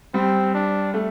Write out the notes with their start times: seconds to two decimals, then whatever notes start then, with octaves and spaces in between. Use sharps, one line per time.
0.14 G3 C4
0.54 D4
0.94 A3